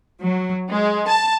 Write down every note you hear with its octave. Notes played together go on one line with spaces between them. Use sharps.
F#3
G#3
A5